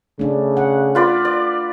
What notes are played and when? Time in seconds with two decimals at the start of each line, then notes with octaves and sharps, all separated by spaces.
0.19 C#3 A3 D4
0.57 F#5
0.95 F4 B4 D5
1.25 D5